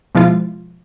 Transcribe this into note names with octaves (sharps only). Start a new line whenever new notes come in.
B2 F3 G#3 E4 F4